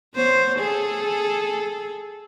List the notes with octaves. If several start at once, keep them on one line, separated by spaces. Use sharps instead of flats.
B3 C5 C#5
G#4 A4